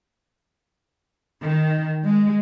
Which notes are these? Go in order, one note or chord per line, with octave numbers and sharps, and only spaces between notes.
D#3
G#3